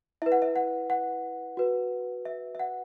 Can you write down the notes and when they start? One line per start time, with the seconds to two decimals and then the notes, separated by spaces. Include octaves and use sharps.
0.22 E4 B4 E5
0.32 F#5
0.42 E5
0.56 F#5
0.90 F#5
1.57 F#4 B4
2.25 E5
2.55 E5
2.59 F#5